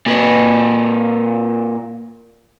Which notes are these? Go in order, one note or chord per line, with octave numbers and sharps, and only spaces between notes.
A#2 B4